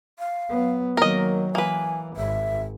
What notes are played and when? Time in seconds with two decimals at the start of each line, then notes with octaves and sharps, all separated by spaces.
0.19 F5
0.50 F#3 B3
0.97 D#3 F#3 A#3 A#4 D#5
1.55 E3 A#3 B4 G#5
2.16 G#1 E5